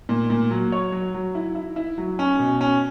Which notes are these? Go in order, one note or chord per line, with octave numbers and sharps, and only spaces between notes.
A#2
A#2
F#3
C#5
F#3
F#3
E4
E4
E4
F#3
C#4
B2
C#4